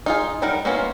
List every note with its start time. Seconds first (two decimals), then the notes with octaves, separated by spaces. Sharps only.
0.06 D#4 F4 G#4
0.42 F#3 G3 D#4 A#4 F#5
0.65 A#3 B3 C#4 E4 F4